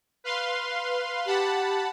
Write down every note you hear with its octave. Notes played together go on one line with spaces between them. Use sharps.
B4 F5 C6
G4 F#5 A5 B5